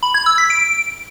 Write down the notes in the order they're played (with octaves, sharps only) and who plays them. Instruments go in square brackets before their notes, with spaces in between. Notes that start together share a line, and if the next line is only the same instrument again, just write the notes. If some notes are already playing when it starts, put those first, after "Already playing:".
[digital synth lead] B5
G#6
E6
B6
D7